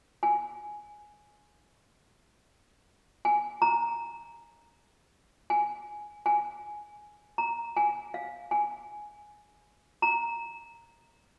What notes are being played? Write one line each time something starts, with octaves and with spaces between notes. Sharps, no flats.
G#5
G#5
A#5
G#5
G#5
A#5
G#5
F5
G#5
A#5